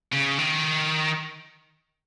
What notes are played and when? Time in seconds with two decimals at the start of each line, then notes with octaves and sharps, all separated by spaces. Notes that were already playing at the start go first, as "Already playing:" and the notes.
0.12 C#3
0.38 D#3